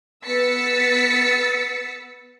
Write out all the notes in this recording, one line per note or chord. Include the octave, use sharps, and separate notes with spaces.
B3 B4 E6 A6 B6 C#7